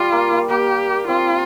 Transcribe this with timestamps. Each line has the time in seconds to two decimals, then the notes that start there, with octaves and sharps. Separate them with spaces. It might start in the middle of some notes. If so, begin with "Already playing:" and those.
Already playing: G3 F4
0.12 A#3
0.31 A#3
0.50 A#3 G4
1.07 C4 F4